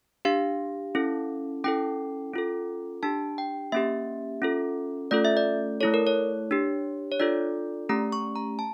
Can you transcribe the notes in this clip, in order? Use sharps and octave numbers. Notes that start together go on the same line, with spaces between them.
D4 G4 F5
C#4 E4 A4
C#4 E4 A4 G5
C#4 F4 A4
D4 G4 A5
G5
A#3 C#4 G4 E5
C#4 F4 A4
A3 C#4 F4 A4 D5
E5
D5
A3 E4 A4 C#5
A#4
C#5
D4 G4
C#5
D4 F4 A4 D5
A3 C#4 G4 A#5
C#6
A#5
A5